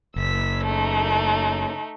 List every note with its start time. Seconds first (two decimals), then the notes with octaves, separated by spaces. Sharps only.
0.16 F#1 E6 B6
0.65 A3 D#4